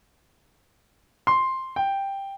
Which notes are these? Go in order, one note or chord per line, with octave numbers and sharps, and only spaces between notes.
C6
G5